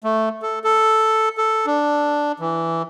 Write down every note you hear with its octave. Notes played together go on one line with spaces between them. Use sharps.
A3
A4
A4
A4
D4
E3